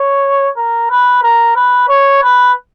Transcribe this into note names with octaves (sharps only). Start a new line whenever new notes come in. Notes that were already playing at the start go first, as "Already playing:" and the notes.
Already playing: C#5
A#4
B4
A#4
B4
C#5
B4